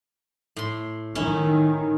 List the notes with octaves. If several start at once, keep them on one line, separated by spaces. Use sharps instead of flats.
A2 C6
D#3 C#4 E4